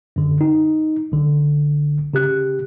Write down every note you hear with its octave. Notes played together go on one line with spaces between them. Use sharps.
F#2 D3
D#4
B1 D3
C#3 G4 F#6